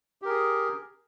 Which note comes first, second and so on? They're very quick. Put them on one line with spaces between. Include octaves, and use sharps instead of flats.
G4 A#4 G#4